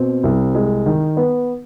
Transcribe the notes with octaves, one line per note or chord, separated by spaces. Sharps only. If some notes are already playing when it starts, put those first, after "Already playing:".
Already playing: B2 C4
C2
G#3
D#3
B3